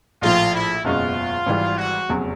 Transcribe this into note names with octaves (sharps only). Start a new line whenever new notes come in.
A#1 A2 F3 F4
E4
F#1 E2 B2 G#3 C#4 F4
G#1 G#2 E3 G3
F#4
F1 E2 C#3 F#3